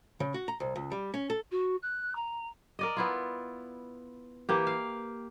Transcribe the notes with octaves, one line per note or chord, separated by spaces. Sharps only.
C#3
F#4
A#5
C2
C#2
G3
C#4
A4
F#4
F#6
A#5
A#4 D5 D#5
B3 E4 F4
E3 A#3 G4
F5